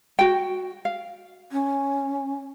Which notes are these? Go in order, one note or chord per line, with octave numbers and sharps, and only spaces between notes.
F#4 G5
F5
C#4